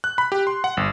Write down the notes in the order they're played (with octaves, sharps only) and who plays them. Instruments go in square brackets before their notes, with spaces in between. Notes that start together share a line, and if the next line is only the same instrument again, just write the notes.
[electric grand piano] F#6
B5
G4
C6
F#5
G1